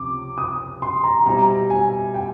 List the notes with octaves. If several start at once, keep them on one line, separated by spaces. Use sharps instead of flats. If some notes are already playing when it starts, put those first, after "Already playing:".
Already playing: C#2 C3 F3 D6
D#6
C6
A#5
B2 G3 C4 E4 A#5
G#5
G5